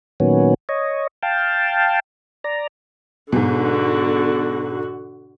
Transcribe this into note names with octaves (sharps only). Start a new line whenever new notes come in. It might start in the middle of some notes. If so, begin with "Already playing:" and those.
A#2 D#3 F#3 B3 C#4
C#5 D#5
F5 G5 A5
D5 A#5
G#2 B2 D3 F#4